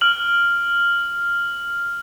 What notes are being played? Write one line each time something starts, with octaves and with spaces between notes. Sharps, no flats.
F6 F#7